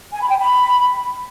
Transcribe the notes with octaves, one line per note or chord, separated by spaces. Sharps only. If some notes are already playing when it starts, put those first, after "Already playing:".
G#5
B5
G5
B5